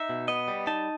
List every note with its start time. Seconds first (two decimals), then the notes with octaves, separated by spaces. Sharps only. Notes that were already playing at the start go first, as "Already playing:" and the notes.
Already playing: D#4 E5
0.09 B2
0.28 B3 D#5
0.48 G3
0.67 D#4 A5